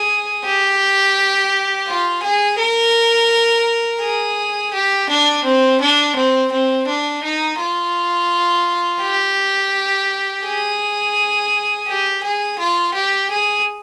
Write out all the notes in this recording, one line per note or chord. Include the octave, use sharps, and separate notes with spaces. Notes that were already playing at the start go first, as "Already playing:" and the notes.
Already playing: G#4
G4
F4
G#4
A#4
G#4
G4
D4
C4
D4
C4
C4
D4
D#4
F4
G4
G#4
G4
G#4
F4
G4
G#4